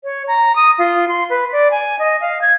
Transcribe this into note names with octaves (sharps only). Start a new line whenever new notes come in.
C#5
A#5
D#6
F4
C6
B4
D5
G#5
D#5
F5
G#6